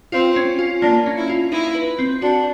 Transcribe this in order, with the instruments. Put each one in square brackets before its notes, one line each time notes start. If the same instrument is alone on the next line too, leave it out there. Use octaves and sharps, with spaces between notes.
[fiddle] C4 [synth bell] F4
[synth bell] C#4
F4
[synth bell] A#3 [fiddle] D4
[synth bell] C#4
[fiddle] E4
[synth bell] F4
[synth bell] D#4 [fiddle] E4
[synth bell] B4
C4
[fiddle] D4 [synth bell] F#4